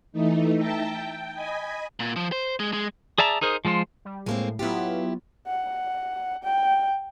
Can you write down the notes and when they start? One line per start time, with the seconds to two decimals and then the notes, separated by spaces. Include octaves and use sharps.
0.12 E3 A3 D#4
0.56 E5 G5 A5 A#5 G6
0.89 G5
1.34 D#5 G#5 B5
2.00 A#2
2.16 F3
2.32 C5
2.60 G#3
2.73 G#3
3.18 G#4 D5 E5 A5 A#5
3.41 D#4 G#4 A#4 C5
3.65 F3 G#3 F4 C5
4.05 G3
4.26 A2 G#3 A#3 C4
4.59 F#3 B3 E4 F4 G4
5.47 F#5
6.44 G5